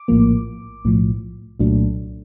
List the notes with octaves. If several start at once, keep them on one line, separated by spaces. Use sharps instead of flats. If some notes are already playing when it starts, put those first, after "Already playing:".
Already playing: D6
A#1 A2 F3 A#3
B1 A2 F3
C2 A#2 F#3 A3 D4